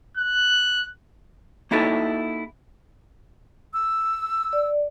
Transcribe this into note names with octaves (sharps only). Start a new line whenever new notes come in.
F#6
A#3 D#4 E4 F#4 A4
E6
D5